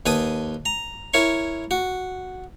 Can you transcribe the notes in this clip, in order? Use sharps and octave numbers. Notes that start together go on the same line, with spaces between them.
D#2 B4 G#5 A5 B5 D#6
A#5
E4 A#4 C#5 C#6
F#4